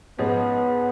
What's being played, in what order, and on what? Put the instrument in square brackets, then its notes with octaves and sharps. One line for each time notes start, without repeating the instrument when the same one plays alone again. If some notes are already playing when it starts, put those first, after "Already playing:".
[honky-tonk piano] G#2 F3 G#3 C#4 [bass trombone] B3